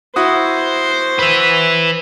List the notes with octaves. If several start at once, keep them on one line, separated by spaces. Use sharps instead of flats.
E4 F#4 C5 D#6
B4 E5